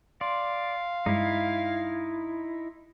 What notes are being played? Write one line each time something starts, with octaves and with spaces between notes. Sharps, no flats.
D5 F5 C6
G2 G#3 D#4 E4